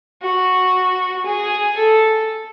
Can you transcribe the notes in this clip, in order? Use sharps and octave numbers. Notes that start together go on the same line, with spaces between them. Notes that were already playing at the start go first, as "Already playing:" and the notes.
F#4
G#4
A4